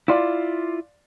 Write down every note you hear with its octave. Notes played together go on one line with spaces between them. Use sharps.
E4 F4 D5 F5 C6